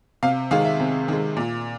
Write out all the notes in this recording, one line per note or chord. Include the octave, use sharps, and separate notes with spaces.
C3 F5
D#3 G#3 F5
E5
C3
D#3 G#3
A#2